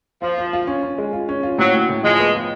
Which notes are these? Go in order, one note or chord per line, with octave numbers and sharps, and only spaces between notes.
F3 F4
F4
F4
C#4
C#4
G#3
F4
C#4
F4
A2 F#3
A2
A2
F3 G#3
B3
F4